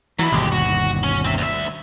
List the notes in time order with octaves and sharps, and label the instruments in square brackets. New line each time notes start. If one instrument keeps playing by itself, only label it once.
[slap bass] E3 [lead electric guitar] F#3 E4
[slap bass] G1 D#2 B2 [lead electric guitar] G#3 G4
[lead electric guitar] F#4
C#4
C4 E5
D2 E5